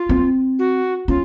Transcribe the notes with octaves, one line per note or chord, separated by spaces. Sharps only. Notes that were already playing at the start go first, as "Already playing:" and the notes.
Already playing: F4
C4
F#4
C#4 F4